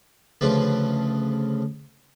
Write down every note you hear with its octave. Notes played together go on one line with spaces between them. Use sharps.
D2 C#3 F3 A3 B4